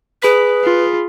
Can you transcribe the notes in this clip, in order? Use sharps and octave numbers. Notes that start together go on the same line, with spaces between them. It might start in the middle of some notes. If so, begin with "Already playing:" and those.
G#4 B4 B5 B6
F4